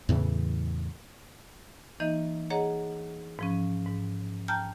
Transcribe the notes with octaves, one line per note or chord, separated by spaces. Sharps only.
E2 A2 C#3 E3
E3 A#3 D#4 D#5
G#4 C#5 D#5 F#5 A#5
G#2 F3 C#4
G#2
G5 A5 A#5 F6 G6